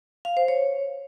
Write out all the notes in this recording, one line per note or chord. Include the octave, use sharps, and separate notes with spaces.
F5
C5
C#5